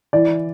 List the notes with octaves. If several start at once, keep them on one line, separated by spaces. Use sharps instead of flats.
E3 D5